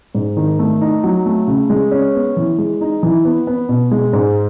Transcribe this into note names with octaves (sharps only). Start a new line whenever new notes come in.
G#2
D#3
A3
D#4
F#3
A3
C#3
G#3
C#4
B3
E3
G#3
D#4
E3
B3
B3
B2
G#3
G#2